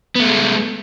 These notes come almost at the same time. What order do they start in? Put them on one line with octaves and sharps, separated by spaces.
B3 A3 G#3